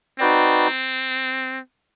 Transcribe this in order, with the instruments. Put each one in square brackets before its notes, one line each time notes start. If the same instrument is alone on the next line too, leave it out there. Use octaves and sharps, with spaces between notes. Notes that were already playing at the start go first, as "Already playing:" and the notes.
[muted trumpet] C4 [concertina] D#4 F#4 B4 D5 G5